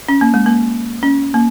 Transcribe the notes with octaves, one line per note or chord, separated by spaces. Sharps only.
C#4
A#3
G#3
A#3
C#4
A#3